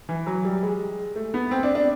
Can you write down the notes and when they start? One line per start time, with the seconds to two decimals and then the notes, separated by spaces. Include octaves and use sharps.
0.09 E3
0.27 F#3
0.45 G3
0.63 G#3
1.15 A3
1.34 B3
1.51 C4
1.63 D4
1.75 D4